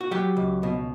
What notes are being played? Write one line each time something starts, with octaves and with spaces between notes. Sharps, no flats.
F#4
F#3 G4
C#2
B2